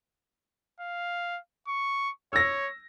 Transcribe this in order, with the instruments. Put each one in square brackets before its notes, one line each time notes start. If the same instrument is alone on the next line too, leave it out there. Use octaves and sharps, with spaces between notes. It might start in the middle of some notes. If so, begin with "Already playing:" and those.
[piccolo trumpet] F5
C#6
[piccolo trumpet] C#5 [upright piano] E6 A#6